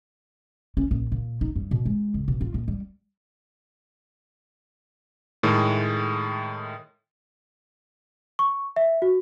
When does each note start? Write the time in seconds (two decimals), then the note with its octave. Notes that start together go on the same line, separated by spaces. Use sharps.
0.77 C#4
0.91 A#1
1.12 A#2
1.41 D#4
1.56 G2
1.71 B2
1.85 G#3
2.14 C#2
2.28 B2
2.41 F4
2.54 A#1
2.68 G3
5.43 A2 D#3 G#3 A3
8.39 C#6
8.76 E5
9.02 F#4